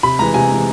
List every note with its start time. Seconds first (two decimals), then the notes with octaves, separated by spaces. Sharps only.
0.03 C3 B5
0.19 E3 G#3 A#5
0.34 C3 G#5
0.50 E3 G#3